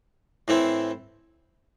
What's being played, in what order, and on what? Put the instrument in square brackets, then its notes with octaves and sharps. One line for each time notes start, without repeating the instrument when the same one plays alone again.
[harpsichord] A2 E3 C4 E4